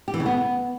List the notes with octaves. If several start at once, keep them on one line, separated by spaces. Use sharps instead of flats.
G4
E3
C#3
B3